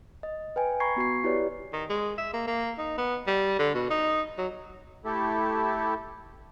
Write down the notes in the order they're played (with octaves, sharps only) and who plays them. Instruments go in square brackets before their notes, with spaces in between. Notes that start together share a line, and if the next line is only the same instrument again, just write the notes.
[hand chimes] D#5
B4 G5 G#5
A#5 B5 C#6 G#6 C7
B3 F#4 C#6 C7
E4 G4 B4 C#5 D5
[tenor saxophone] D#3
G#3
E5
A#3
A#3
D#4
B3
G3
D3
B2
D#4
F#3
[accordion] A3 E4 G4 A4